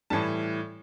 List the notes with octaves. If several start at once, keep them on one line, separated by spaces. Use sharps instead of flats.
A2 E3 G3 A5